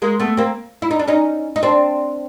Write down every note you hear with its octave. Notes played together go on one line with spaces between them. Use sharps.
G#3 A#3
A3 B3
A#3 C4
E4
D#4
D4
C#4 D#4
D#4
C4 D4